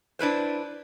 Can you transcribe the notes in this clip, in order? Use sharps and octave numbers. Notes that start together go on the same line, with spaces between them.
D4 E4 B4 C5